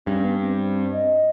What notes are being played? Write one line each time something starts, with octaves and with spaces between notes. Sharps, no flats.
G2 C#4
B3
C4
D#5